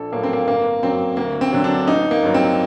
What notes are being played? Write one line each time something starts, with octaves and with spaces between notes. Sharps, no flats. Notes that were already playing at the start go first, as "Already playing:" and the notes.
Already playing: A#1 A4
A2 F#3 A#3
C4
A#3
G1 A#3
F#2 F#3 C4
D2 A#3
C4
D3 F#3
D4
A1 D#4
A#3
G2 F#3
C4